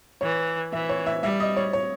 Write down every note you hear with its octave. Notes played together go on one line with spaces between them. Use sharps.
E3 C#5
E3 E5
C#5
E5
G3 E5
D#5
C#5
C#5